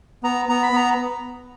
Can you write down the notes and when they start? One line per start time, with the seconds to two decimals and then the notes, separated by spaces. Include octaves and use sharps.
0.23 B3 A#5
0.49 B3 A#5
0.63 B5
0.73 B3 A#5